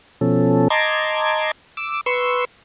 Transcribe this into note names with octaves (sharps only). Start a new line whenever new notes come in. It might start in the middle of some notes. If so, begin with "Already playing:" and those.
B2 F3 C#4 A4
D#5 A5 A#5 C6 D6 G#6
D6 E6
B4 C6 C#6 E6